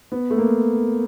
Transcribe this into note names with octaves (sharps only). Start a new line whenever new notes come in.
B3
A3
A#3